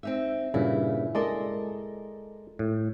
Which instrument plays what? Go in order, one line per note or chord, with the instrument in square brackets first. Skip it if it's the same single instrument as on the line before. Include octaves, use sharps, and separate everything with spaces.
[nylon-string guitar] C4 D#4 E5
[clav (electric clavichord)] G2 A#2 C#3 [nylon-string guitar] E4
[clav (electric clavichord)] G#3 D5 [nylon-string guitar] A4 A#4 D#5
[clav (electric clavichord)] A2